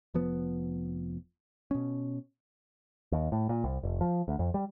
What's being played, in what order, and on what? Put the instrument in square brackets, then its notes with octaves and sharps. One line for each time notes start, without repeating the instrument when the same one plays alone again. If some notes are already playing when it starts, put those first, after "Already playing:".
[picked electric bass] F1 F3 B3
B2 C#4
D#2
A2
A#2
C2
F1
F3
D2
F2
G3